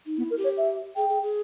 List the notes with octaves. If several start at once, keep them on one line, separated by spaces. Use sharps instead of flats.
D#4
B3 E4
A#4
G4
C#5
E5
G#4 G5
G#4
G#4